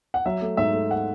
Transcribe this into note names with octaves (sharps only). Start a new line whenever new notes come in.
F#5
F#3 E5
A3
G#2 E5
A3
F#5